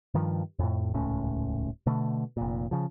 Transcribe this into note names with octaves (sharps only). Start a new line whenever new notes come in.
G2 D#3 F3
F2 A2
D#1 C#2 A2 C#4
B2 D3 A3
F1 A#2
C#3 F3